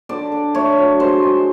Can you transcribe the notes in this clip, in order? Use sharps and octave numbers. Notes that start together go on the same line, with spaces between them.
D3 D5
D3
A3 C#5
F#3
G#3 C5
G#3